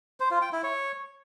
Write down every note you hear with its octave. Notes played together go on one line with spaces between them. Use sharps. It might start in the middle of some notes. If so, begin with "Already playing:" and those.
C5
F4
G5
E4
C#5